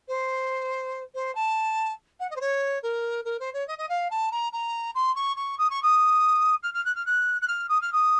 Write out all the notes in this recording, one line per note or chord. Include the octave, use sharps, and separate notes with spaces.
C5
C5
A5
F#5
D#5
C5
C#5
A#4
A#4
C5
C#5
D#5
D#5
F5
A5
A#5
A#5
C6
C#6
C#6
D#6
C#6
D#6
F6
F6
F#6
F6
F#6
F#6
F6
D#6
F6
D#6